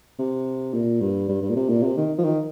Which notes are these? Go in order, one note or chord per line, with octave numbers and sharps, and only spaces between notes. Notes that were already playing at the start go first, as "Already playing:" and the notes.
C3
A#2
G2
G2
G2
A#2
C3
A#2
C3
D#3
F3
D#3